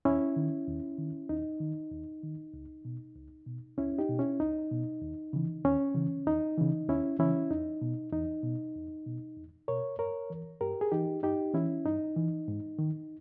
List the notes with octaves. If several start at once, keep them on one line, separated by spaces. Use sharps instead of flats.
D#2 C#4 E4
D#3
D#2
D#3
D#2 D#4
D#3
D#2
D#3
C#2
B2
C#2
B2
C#2 C#4 E4
D#4 G4
B2
C#4 E4
C#2 D#4
B2
D#2
C#3 E3
D#2 C#4
C#3 E3
D#2 D#4
C#3 E3
D#2 C#4 E4
C#3 E3 C#4 E4
E2 D#4
B2
E2 D#4
B2
E2
B2
E2
B2 A#4 C#5
G2 A#4 C#5
E3
G2 G4 A#4
G#4
E3 D#4 G4
G2 D#4 G4
E3 C#4 E4
G2 D#4
E3
G#2
D#3